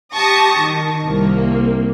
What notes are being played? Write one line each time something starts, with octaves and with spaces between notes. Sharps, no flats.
G4 A5 C#6 D#6 A#6
D#3
C2 A#3